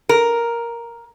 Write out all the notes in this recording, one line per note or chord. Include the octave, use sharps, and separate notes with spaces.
A#4